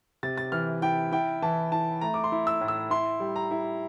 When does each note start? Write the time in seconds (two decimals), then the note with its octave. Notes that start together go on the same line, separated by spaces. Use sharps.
0.23 C3 A6
0.38 A6
0.52 E3 F6
0.82 E4 G5
1.12 E4 G5
1.42 E3 A5
1.72 E4 A5
2.01 A3 A#5
2.14 D6
2.24 C6
2.32 E4
2.47 E6
2.61 A2
2.68 E6
2.90 E4 C6
3.20 G3
3.36 A#5
3.51 E4